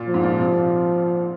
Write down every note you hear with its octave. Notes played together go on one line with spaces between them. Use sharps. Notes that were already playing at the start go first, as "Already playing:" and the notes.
Already playing: A#2
F3
G#2
A#2
C3